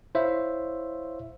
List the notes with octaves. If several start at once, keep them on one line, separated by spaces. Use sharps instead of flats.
E4 C5 C#5 E5 F5